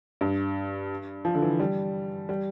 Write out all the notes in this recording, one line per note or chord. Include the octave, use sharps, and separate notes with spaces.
G2
F3
D3
E3
G3
G3